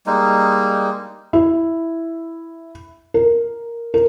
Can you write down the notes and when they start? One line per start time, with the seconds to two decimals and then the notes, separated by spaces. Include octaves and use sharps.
0.06 G3 G#3 A#3 D#4
1.33 E4
3.14 A#4
3.94 A#4